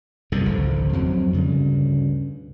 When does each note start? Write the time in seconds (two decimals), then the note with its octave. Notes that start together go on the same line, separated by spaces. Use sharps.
0.32 C2 G2 D3
0.45 G#1 C#2 D3 F3
0.93 F2 F#3 C4
1.31 D2 G2 C#3